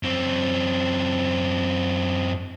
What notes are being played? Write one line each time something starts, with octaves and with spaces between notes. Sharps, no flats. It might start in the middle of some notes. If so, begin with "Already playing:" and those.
F#2 C4